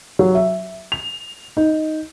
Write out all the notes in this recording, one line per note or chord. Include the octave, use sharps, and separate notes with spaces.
F#3
E5
F7
D#4